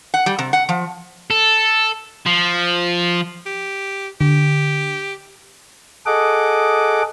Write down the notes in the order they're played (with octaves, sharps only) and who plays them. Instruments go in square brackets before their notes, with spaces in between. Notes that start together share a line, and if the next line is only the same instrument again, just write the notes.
[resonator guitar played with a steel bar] F#5
G3
C3
F#5
F3
[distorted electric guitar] A4
F3
[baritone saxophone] G4
[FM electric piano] D3 [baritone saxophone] G4
[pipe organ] G#4 A4 D#5 F#5 D6